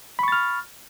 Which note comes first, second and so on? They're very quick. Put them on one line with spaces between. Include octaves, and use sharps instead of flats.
B5 C#6 A6 F6